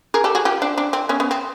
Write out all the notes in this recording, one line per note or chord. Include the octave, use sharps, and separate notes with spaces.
G#4 A#4
G4 A4
F#4 G#4
F4 G4
C4 D4
C4 D4
C4
B3 C#4
B3 C#4
C4